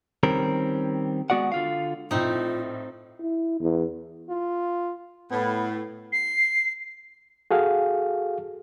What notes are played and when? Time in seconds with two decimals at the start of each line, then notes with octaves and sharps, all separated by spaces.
0.23 D#3 G3 C4 C#4 A#4
1.30 G#3 B3 F#4 D5 F#5
1.52 D3 F4 F5
2.11 A#1 A2 C4 D#4 F4
3.20 E4
3.60 E2
4.30 F4
5.31 A2 B3
6.12 C7
7.51 F#4 G#4 A4 F5